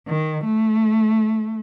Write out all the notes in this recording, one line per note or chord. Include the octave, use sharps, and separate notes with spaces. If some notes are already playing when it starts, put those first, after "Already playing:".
D#3
A3